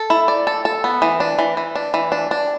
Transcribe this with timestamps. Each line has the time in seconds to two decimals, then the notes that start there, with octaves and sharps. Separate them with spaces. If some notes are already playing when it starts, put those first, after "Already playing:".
Already playing: A4
0.10 E4
0.28 D5
0.47 A4
0.65 A4
0.84 B3
1.02 E3
1.20 D4
1.39 E3
1.57 E3
1.75 D4
1.94 E3
2.12 D4
2.31 D4